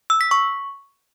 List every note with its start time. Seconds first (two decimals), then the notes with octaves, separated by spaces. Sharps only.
0.10 E6
0.21 B6
0.31 C#6